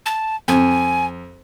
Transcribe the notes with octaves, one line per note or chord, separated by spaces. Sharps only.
A5
F2 G#5